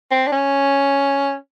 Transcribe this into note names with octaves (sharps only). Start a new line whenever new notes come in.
C4
D4
C#4